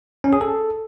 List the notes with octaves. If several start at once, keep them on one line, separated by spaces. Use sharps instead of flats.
C#4
G#4
A4